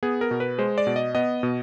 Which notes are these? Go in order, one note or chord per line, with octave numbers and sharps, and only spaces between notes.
B3 G#4
A#4
B2
B4
G#3 C5
D5
B2
D#5
B3 D#5
B2